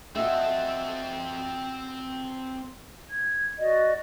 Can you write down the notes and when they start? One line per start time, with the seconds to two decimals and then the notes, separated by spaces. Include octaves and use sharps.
0.15 C4 F#4 A4 D#5 E5
3.10 G#6
3.58 F#4 D5 D#5